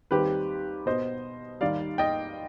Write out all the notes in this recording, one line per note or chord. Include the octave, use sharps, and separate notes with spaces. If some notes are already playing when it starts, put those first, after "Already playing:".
D#2 D#3 G3 C4 G4 B4
B2 B3 C5 D#5
D#2 D#3 G3 D5 F5
D#5 G5